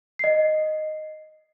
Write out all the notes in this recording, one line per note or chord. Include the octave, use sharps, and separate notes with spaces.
D#5 C7